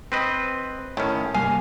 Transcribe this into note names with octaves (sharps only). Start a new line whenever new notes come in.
C4 B4 D#5
A2 D#3 C#4 E4
C3 G3 A#3 F5 G#5